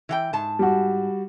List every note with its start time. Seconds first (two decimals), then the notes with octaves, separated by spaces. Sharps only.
0.09 E3 F#5 G5
0.33 G#2 A5
0.59 G3 F#4